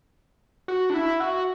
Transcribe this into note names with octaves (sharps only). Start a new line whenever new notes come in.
F#4
D4
E4
F#4